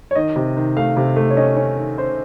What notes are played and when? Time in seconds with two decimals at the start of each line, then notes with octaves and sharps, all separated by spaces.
0.11 C#5
0.15 D#3 D#5
0.36 C3
0.57 D#3
0.76 A3 F5
0.97 C3
1.16 A3
1.31 C#5
1.37 C#4 D#5
1.57 C#4
1.77 D#3
1.98 C#4 C5